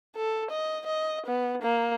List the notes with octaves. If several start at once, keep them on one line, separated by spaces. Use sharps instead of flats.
A4
D#5
D#5
B3
A#3